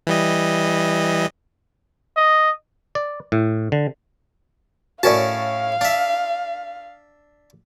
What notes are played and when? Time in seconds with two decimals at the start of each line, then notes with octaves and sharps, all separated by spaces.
0.07 E3 G3 D#5
2.17 D#5
2.95 D5
3.32 A2
3.72 D3
5.03 A2 C#4 F#4 A#4 D5 F5 A5
5.81 D4 E5